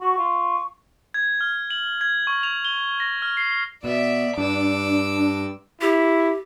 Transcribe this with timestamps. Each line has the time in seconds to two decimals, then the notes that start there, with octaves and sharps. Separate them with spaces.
0.01 F#4 C#6
0.18 F4
1.14 G#6
1.41 F6
1.70 F#7
2.01 G#6
2.27 C#6
2.43 F7
2.65 G7
3.00 A#6
3.22 F6
3.37 C7
3.84 B2 D5 E5
4.38 G2 D4 D6 E6
5.81 E4 G4